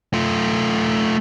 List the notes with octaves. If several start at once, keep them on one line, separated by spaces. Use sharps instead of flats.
A3 F4